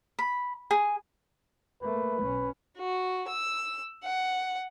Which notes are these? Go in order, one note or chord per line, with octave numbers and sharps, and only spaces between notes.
B5
G#4
A3 A#3 B4
B1 C#4
F#4
E6
F#5